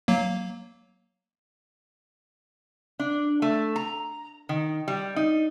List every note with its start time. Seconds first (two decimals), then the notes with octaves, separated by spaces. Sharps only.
0.08 F#3 A#3
2.99 D4
3.42 A3
3.76 A#5
4.49 D#3
4.88 G3
5.16 D#4